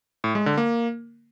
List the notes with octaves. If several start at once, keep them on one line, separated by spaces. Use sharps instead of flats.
A2
G#3
D3
A#3